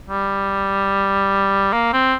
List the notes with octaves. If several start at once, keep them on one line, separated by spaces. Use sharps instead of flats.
G3
A#3
C4